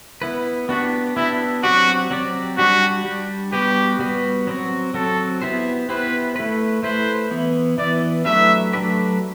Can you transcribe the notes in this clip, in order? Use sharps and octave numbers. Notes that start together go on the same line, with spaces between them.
B3 E4 B4
B3 D4 F#4 G4
B3 D4 E4 G4
F#3 C4 F#4 G4 D5
F#3 C4 G4 D5
G3 D4 F#4 G4
G3 D4 G4
G3 B3 F#4 G4 B4
G3 B3 F#4 B4
F#3 C4 F#4
F#3 C4 F#4 A4
B3 E4 G4 C5
B3 E4 G4 B4 C5
A3 E4 B4
A3 E4 B4 C5
E3 B3 E4
E3 B3 E4 D5
F#3 A3 D4 G4 B4 E5
F#3 A3 D4 G4 B4